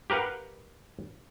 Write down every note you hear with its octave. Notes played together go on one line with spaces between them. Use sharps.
G4 A#4 B4 F5 F#5